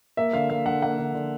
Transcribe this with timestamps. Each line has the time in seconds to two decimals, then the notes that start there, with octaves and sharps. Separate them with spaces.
0.17 A#3 E5
0.33 D3 F5
0.50 A#3 F5
0.66 D3 F#5
0.82 A#3 F#5
0.99 D3
1.14 D3